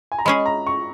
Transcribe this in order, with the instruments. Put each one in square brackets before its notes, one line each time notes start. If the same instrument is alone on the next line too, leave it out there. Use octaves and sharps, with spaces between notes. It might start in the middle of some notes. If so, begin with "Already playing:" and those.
[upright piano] G#5
A#5
[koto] G#3 C#4 G#4 [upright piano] B5
[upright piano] A#5
C#6